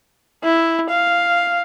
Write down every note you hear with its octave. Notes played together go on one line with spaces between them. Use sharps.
E4
F5